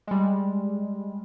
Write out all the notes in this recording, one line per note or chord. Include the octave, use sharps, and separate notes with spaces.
G3 G#3